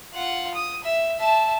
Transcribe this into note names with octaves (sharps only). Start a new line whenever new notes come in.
F4 F#5
D#6
E5
E5 A5